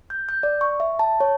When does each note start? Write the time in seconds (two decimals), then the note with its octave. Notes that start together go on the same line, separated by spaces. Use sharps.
0.10 G6
0.29 G6
0.43 D5
0.61 C#6
0.80 E5
0.99 A5
1.20 C#5